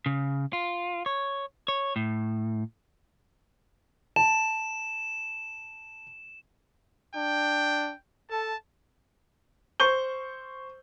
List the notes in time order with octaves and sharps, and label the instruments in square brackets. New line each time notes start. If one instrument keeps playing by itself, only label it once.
[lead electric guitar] C#3
F4
C#5
C#5
A2
[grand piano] A5 [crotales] E7
[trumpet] D4 [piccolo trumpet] G5
[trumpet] A4 [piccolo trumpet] A5
[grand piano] C5 C#6 G6 G7